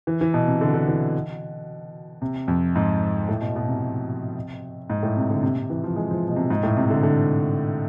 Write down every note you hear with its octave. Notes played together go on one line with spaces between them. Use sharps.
E3
E3
B2
C3
D3
D3
E3
C3
F2
G#2
A2
B2
B2
C3
G#2
A2
C3
D3
C3
C3
E3
F3
G#3
F3
B2
C3
G#2
A2
C3
D3
D3